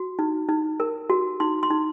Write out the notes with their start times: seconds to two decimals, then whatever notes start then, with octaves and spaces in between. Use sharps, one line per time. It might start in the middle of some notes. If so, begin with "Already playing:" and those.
Already playing: F#4
0.19 D#4
0.49 D#4
0.80 A#4
1.10 F#4
1.40 D#4 C6
1.63 C6
1.71 D#4